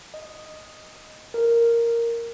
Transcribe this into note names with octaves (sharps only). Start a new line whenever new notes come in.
D#5
A#4